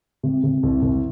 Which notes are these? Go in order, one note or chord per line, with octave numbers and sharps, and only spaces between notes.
C3
C3
C2
C2